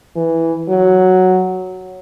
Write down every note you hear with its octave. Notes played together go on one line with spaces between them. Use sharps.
E3
F#3